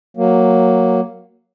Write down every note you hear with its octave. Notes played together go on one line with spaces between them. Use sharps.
F#3 A#3